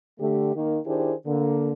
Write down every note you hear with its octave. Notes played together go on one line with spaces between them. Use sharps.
D3 A3 G4
D#3 A#3
D#3 D4 E4 G4 G#4 C5
D3 A#3